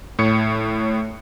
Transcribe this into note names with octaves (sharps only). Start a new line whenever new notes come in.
A2 C#5 C#7